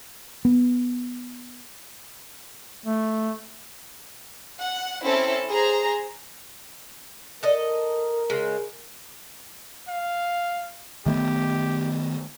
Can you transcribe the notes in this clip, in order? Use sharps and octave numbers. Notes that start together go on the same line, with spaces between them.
B3
A3
F#5
C4 C#4 E4 A4
G#4 C5 A#5
A4 A#4 D#5
C#3 G#3
F5
D#3 A3 B3 G4